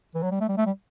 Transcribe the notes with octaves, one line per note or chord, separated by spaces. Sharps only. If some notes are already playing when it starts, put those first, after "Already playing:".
E3
F#3
G3
A3
G3
A3
G3